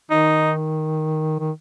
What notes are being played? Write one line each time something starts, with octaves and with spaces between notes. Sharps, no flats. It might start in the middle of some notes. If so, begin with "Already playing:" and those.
D#3 D#4
D#3